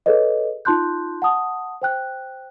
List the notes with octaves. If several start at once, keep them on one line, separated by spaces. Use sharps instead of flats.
G#4 A4 B4 C#5 D#5
D#4 F4 A5 C6 F#6 G6
F#5 A5 D#6
C5 G5 F#6